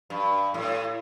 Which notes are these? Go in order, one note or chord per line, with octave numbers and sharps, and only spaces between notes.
G2
A2